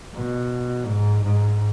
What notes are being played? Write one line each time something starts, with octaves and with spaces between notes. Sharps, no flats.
B2
G#2
G#2